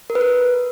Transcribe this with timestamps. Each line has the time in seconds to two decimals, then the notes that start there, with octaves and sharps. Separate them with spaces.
0.10 A#4
0.15 B4
0.21 A#4